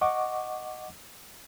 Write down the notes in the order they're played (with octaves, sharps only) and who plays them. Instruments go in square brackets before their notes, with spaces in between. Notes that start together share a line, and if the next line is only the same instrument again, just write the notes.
[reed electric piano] D#5 F#5 C#6 D6